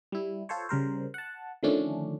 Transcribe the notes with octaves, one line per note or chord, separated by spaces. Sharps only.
G3 E4
F4 A4 C5 C#5
C#3 G3 A#4 C5
F#5 A5
D3 D#3 F3 A3 C#4 D4